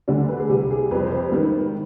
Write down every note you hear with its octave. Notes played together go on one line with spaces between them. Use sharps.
D2 D3 G3 D4
B4
G#4
C2 C3 G3 G4
G#4
F2 C3 G3 B4
C5
B4
G#2 D#3 G3